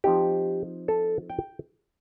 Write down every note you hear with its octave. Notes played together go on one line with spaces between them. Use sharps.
F3 C4 D#4 G4
A4
G5